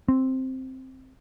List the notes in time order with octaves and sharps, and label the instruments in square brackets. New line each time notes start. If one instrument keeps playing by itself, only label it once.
[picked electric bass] C4